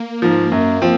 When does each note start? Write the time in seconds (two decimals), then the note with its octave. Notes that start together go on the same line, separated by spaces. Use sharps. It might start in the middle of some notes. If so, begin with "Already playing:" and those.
Already playing: A#3
0.22 G#2 F3
0.52 F#2
0.82 F3 C4 F4